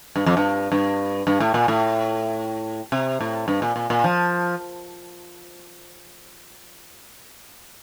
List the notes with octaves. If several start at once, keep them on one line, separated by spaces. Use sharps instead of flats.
G2
F2
G2
G2
G2
A2
A#2
A2
C3
A2
G2
A#2
A#2
A#2
F3